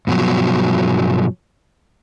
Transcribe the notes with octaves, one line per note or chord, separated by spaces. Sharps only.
G2 B2 F3 F#3